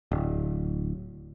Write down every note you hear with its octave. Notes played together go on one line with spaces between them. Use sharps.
D1